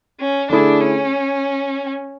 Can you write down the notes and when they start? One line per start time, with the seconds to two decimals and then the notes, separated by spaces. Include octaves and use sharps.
0.20 C#4
0.50 D3 A3 D4 E4 G#4
0.80 C#4